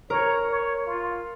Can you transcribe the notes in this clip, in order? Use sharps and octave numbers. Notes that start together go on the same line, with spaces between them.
A#4 C#5
C#5
F4